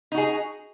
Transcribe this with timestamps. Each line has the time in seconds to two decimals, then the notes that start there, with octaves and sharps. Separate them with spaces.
0.12 D#4
0.15 F#4
0.18 G#4